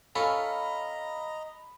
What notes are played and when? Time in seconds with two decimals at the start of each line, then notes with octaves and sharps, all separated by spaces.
0.15 C#4 F4 A4 D#5 A#5 B5